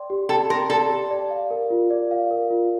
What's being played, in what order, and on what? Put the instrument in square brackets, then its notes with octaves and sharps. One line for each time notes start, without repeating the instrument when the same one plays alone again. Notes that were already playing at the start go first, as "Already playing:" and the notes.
Already playing: [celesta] D5 G5 C6
G4
[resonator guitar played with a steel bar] A4 [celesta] G5
[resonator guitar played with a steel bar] A#4 [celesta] C6
[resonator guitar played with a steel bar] A4 [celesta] D5
[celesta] G4
D5
F5
A#4
F4
D5
F5
A#4
F4